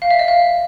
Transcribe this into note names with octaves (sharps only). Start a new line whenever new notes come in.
F5
E5
D#5
F5